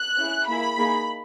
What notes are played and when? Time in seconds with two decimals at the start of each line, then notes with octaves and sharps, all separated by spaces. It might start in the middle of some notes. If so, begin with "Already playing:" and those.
Already playing: F#6
0.16 C#4 E4 G#4
0.48 A#3 E4 G#4 B5
0.77 A#3 D#4 G#4